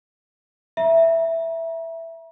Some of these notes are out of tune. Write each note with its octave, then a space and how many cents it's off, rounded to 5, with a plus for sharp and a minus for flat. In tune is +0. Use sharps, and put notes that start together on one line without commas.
E5 +0 A#5 +40